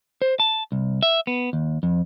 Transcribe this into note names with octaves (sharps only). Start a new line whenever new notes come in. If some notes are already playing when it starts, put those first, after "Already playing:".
C5
A5
C2
E5
B3
D#2
F2